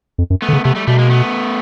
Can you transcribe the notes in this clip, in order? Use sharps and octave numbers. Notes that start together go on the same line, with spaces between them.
F2
F#2
A3 B3
D3
C#3
C3 A3 B3
G3 A3
B2 G3 A3
G#3 A#3
A3 B3